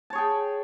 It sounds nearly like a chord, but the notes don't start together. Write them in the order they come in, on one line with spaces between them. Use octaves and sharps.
A5 C#5 G#4 G5